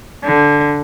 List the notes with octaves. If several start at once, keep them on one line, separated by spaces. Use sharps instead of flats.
D3